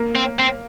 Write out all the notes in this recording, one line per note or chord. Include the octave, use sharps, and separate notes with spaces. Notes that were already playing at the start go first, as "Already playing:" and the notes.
Already playing: A#3
C4
C4